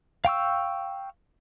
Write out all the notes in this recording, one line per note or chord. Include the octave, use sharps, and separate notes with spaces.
F5 G5 C#6 E6